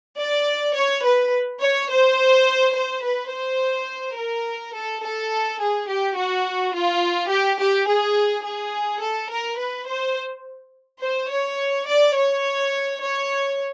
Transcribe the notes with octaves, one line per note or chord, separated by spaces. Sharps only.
D5
C#5
B4
C#5
C5
C5
B4
C5
A#4
A4
A4
G#4
G4
F#4
F4
G4
G4
G#4
G#4
A4
A#4
B4
C5
C5
C#5
D5
C#5
C#5